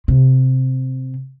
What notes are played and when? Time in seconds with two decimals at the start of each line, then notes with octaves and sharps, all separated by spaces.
0.08 C3